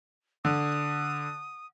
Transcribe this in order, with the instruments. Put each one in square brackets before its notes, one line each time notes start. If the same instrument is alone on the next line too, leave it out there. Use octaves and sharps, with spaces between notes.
[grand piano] D3 [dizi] D#6